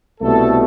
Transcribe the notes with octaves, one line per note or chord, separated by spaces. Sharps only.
C2 B2 A3 A4